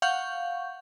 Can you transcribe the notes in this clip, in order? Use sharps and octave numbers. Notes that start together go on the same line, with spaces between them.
F5 F#5 C#6 G6